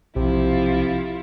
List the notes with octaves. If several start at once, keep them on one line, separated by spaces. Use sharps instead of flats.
B1 C3 F3 E4 F4